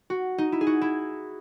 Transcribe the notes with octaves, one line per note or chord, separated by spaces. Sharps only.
F#4
D#4
E4
G#4
F#4
E4